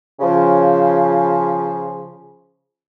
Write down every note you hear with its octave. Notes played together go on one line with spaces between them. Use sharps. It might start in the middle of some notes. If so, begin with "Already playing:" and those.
C#3 F3